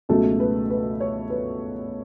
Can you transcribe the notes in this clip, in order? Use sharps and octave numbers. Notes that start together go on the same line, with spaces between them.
C#2 B2 F#3 A3 A4
B4
B4
C#5
B4